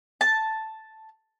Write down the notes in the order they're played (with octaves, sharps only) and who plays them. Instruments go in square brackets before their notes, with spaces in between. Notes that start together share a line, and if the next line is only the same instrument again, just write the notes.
[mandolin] A5